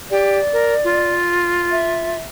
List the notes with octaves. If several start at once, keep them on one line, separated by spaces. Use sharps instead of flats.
G4 D5
A#4
F4
E5